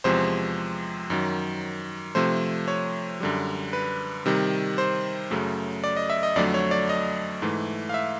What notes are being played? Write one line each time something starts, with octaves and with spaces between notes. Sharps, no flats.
E2 C3 F3 G#3 C5
F#2 D#3 F#3
C3 F3 A3 C5
C#5
F#2 D3 G3
B4
C3 D#3 G3
C5
F#2 C#3 F#3 A3
D5
D#5
E5
D#5
F2 D3 F#3 A3 D5
C#5
D5
D#5
G#2 E3 A3
F5
E5